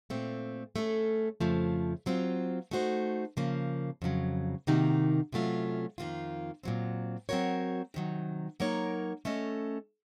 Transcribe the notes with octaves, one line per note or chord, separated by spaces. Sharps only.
A#2 A3 C4
A3 C#4 A4
F2 C#3 F3 A3
F#3 C4 F4
A3 D#4 F#4 C5
C#3 F3 A#3
F2 C#3 F#3
C3 D#3 A#3 D#4 F#4
C3 F#3 A3 C#4 F4
F2 D#3 A#3 F4
A#2 F#3 C4
F#3 C4 F#4 A#4 C#5
C3 D#3 F#3
F#3 A#3 D#4 A#4 C#5
A3 C#4 A4 D#5